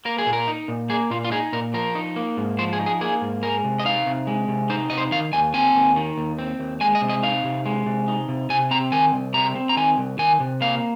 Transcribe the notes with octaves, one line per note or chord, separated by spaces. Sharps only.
A#3 A#4
G#4
A#2
A#4
D#4
A#2
A#3 G#4
A#2 F4
F4
D#4 G#4
A#2 A#4
F3 A#4
D#4
A#3
G#2
F3 C5
G#4
D#4
G#4
A#3 G#4
G#2
G#3 A#4
C3
D#5
D#4 F5
C3
G#3
C3
D#4 C5
C3 D#5
C5
D#3 F5
D#2 G#5
C4 G#5
D#2
D#3
D#2
C4
D#2
G#3 G#5
D#5
C3
D#5
D#4 F5
C3
G#3
C3
D#4
C3
C3 G#5
C4 A#5
D#3 G#5
C2
C3 A#5
C4
A#5
D#3 G#5
C2
D#3 G#5
C3
A#3 F5